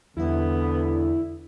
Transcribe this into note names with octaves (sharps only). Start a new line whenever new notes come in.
E2 D3 G3 B3 E4 E5